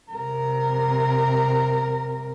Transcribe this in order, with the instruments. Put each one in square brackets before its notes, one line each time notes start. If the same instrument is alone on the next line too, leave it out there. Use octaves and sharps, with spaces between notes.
[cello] C3 A#4